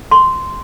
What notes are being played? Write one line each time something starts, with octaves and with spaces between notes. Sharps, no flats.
C6